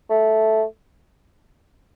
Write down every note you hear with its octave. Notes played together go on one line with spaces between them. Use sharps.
A3